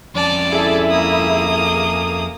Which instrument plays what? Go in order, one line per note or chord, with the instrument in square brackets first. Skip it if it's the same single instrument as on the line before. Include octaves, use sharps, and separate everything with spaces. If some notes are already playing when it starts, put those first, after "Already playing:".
[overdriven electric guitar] F2 C#4 [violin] D5 A5
[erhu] E4 [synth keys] G#4 A4 E5
[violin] A#3 D#6